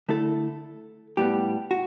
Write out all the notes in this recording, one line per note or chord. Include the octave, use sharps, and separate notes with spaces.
D3 A3 E4 A4
A2 G3 B3 G4
F#4